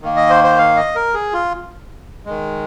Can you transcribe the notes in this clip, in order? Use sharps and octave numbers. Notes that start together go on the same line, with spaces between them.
D#3 A#3
D#5
C5
C5
F5
D#5
A#4
G#4
F4
D#3 G#3